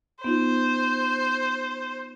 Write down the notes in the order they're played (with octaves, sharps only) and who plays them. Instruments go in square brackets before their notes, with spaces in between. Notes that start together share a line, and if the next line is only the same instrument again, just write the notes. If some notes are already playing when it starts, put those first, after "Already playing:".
[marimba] B3 D#4 F4 [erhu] C5